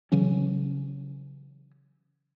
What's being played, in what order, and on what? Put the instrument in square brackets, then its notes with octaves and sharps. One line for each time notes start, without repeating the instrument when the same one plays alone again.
[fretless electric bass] C#3 E3 F#3 C#4